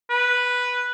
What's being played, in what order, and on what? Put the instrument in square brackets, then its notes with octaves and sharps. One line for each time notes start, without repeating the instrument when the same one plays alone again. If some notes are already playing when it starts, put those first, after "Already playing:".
[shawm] B4